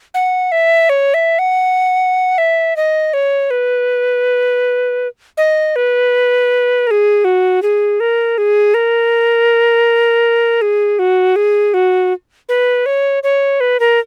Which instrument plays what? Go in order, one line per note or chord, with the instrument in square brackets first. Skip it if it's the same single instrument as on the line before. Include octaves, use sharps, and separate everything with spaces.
[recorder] F#5
E5
C#5
E5
F#5
E5
D#5
C#5
B4
D#5
B4
A#4
G#4
F#4
G#4
A#4
G#4
A#4
G#4
F#4
G#4
F#4
B4
C#5
C#5
B4
A#4